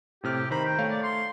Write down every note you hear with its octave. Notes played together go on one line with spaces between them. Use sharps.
A2 C3 G4 F6
D#3 C5 A#5 B5
G5
A3 C#5 F5
D5
C6